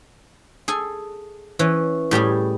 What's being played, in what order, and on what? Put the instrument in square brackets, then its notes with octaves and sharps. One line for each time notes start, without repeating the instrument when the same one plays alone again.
[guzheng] G#4 A4 G#5
E3 C#4
A2 G3 G4 G#4